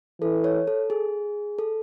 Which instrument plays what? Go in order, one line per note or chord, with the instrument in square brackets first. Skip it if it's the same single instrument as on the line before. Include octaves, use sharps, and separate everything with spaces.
[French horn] E3 [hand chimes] A4
[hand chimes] C#5
A4
G#4
A4